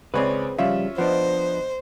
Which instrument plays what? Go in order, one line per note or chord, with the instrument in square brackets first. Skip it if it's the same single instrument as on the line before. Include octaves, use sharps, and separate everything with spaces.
[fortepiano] C#2 C#5 D5 [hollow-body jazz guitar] C4 G#4 B4
[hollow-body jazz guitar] C#3 F3 G3 [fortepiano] C#4 F4 E5
[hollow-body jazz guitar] F3 D4 [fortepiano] B3 D#5 [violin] C5